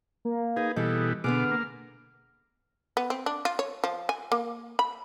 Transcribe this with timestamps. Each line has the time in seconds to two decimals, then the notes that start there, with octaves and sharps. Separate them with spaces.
0.25 A#3
0.56 D#4 G#4 B4
0.76 B2 E3 G3 G#4 A4 D#5
1.24 B2 D3 B3 G#4 D6 F6
1.51 A#3
2.97 B3
3.10 C4
3.26 D4
3.45 F4
3.59 C#5
3.84 F3
4.09 G#5
4.32 A#3
4.79 B5